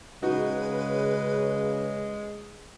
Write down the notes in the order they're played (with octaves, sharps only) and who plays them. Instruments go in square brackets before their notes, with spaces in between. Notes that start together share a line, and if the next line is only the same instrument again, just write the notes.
[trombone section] C#3 [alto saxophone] G#3 [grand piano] D#4 F#4 [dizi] B4